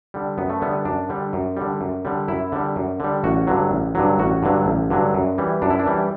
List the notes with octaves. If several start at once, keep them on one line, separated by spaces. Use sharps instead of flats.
D3 G3
F#2 B3
A3
D3 G3 B3
F#2 D4
D3 G3
F#2
D3 G3
F#2
D3 G3
F#2 E4
D3 G3
F#2
D3 G3
A1 F#4
G2 D3 F#3
A1
G2 D3 F#3
A1 F#4
G2 D3 F#3
A1
G2 D3 F#3
F#2
E3 G3
F#2 D4
E4
D4
E3 G3